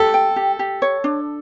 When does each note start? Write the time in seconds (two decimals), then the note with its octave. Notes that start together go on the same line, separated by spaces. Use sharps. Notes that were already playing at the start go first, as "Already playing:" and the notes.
Already playing: G4 A4
0.14 G5
0.36 G4
0.59 G4
0.82 C#5
1.04 D4